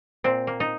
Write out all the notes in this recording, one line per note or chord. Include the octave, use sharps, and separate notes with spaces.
A#2 C4
A#3
D#4